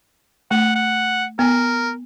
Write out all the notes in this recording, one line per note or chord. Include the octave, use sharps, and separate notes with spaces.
A3 F#5
F#5
B3 A#4 G#5